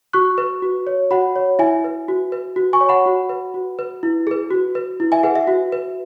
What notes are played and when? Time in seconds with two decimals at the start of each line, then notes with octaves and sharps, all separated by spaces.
0.13 F#4 C#6 F#6
0.38 B4
0.62 F#4
0.87 C#5
1.11 F#4 F#5 B5
1.36 C#5
1.59 E4 E5 G#5
1.84 B4
2.08 F#4
2.32 B4
2.56 F#4
2.73 G#5 C#6
2.81 C#5
2.89 F#5 B5
3.06 F#4
3.29 B4
3.54 F#4
3.79 B4
4.03 E4
4.27 G#4 B4
4.51 F#4
4.75 B4
5.00 E4
5.12 E5 G#5
5.23 G#4 B4 F#5
5.35 E5
5.47 F#4
5.72 B4